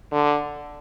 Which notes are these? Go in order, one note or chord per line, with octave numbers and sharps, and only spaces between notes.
D3